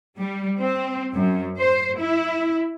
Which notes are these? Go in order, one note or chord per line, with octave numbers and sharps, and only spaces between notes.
G3
C4
F#2
C5
E4